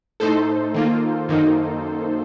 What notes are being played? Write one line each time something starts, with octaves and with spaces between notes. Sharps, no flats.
A2 A3 D#4 A4 C5
D#3 A#3 F4
F#2 D#3 A#3 D#4